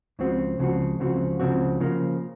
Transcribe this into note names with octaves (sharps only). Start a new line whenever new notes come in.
C#2 C#3 F3 C4 F#4
C#2 C#3 F3 C4 F#4
C#2 C#3 F3 C4 F#4
C#2 C#3 F3 C4 F#4
C#3 F3 A#3